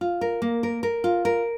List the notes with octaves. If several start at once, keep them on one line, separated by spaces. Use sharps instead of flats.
F4
A#4
A#3
A#4
A#4
F4
A#4